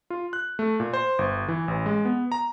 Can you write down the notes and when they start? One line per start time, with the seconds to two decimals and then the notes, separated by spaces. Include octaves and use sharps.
0.10 F4
0.33 F#6
0.59 A3
0.80 A#2
0.94 C5
1.19 G1
1.48 E3
1.68 A1
1.86 G#3
2.05 B3
2.32 A#5